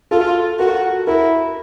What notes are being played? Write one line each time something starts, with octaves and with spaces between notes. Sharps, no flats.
F4 A4
F#4 A#4
E4 A#4